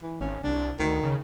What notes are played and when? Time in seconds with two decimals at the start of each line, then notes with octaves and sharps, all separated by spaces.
0.02 E3
0.21 G#1 C#4
0.44 C2 D4
0.80 D2 D#3
1.03 C#3